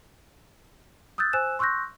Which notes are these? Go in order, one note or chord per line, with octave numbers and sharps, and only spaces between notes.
D#6 E6 F#6 G6 A6
C5 G#5 E6 F#6 E7
C6 C#6 E6 F#6 G6 A#6